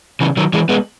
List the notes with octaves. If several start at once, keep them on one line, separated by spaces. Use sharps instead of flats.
C#3 E3
D#3 F#3
E3 G#3
G#3 B3